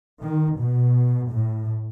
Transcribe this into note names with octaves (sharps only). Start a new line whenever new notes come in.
D#3
B2
A2